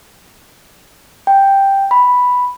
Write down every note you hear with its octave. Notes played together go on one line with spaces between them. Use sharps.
G5
B5